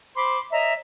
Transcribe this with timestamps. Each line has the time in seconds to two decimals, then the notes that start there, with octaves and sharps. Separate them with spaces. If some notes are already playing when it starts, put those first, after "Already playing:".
0.15 C5 B5 C6 D6
0.51 C#5 D#5 E5 A#5